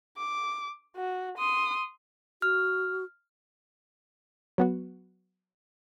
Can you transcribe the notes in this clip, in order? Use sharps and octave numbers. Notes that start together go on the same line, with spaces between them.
D6
F#4
C6 D#6
F#4 F6
F#3 B3 F#4